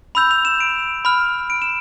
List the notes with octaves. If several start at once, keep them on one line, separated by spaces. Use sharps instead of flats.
B5 E6 G6 F7
F7
E7
D7
B5 F6
D7
E7